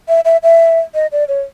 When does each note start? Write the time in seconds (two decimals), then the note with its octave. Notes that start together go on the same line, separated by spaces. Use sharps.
0.08 E5
0.25 E5
0.43 E5
0.94 D#5
1.12 D5
1.28 C#5